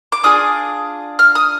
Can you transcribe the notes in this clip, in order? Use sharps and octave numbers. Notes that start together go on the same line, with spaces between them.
D6
D4 F4 G#4 D#6
F6
D#6